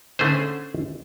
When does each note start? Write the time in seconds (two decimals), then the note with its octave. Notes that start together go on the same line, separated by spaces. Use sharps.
0.19 D3 A3 C#4 G#4 C5